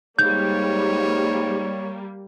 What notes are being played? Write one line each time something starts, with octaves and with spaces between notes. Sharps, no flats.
G#2 G3 A#3 C#5 G6